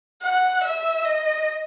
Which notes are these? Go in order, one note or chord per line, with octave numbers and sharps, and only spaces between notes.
F#5
E5
D#5